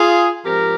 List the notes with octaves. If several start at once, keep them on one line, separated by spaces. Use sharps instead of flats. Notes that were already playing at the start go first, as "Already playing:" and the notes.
Already playing: F4 G#4
G#2 F3 C4 G4 A#4